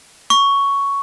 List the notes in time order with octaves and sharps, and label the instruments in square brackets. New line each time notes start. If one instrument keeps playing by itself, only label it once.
[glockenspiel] C#6